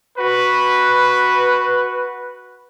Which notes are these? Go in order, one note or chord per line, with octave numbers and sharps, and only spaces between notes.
F#4 B4